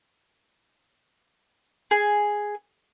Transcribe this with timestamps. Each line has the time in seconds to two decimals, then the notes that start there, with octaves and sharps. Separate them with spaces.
1.91 G#4